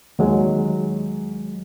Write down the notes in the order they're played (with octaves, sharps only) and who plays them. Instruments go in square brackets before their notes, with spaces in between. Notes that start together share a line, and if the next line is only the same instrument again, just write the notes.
[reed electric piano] D#2 F#3 G#3